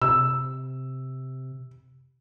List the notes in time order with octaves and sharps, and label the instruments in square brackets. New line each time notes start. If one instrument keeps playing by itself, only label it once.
[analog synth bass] C3 [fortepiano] E6